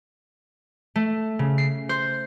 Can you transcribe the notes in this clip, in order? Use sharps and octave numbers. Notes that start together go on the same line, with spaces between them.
A3
C#3
C7
C5